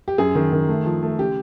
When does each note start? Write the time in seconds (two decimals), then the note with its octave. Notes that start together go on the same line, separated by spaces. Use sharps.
0.08 G4
0.18 F#2 G#4
0.35 D#3
0.53 D#3
0.69 A3
0.85 F3
1.03 A3
1.19 C#3 G4